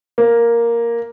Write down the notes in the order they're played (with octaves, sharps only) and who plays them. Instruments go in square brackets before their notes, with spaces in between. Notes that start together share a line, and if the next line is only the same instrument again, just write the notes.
[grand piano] A#3